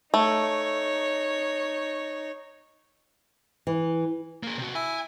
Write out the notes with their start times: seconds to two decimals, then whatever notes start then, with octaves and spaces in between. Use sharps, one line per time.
0.14 A3 D#4 C#5
3.67 E3
4.43 A#3 G#4
4.58 C3 F#4
4.75 E4 G#5